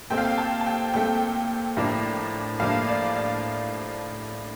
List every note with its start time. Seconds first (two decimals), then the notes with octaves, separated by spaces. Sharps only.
0.10 A#2 A3 C4 G5
0.18 F5
0.25 G5
0.38 A5
0.61 A5
0.66 G5
0.94 A#2 A3 C4 G5
1.77 A2 F3 A#3 D4
2.60 A2 F3 A#3 D4 F5
2.89 D5
3.16 F5